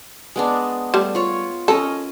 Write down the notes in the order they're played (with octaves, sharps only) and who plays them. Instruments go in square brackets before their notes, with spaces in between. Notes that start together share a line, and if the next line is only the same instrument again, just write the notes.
[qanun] G#3 B3 D4
[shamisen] G3 A3
[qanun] F4 C#5
[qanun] C#4 A#4 D#5 [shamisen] A4